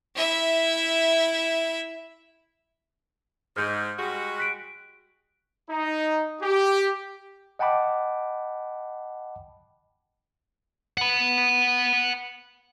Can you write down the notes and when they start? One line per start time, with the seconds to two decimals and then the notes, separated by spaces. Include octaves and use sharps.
0.16 E4 E5
3.57 G#2 F6 G6
3.98 G3 G#3 F#4
4.38 F#6 B6 D7
5.70 D#4
6.42 G4
7.59 D#5 F#5 G5 A5 B5 D6
10.98 F#5 B5